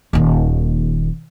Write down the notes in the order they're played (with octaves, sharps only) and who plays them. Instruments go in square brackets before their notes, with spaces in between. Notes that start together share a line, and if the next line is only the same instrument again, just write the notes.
[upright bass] D#1 D#2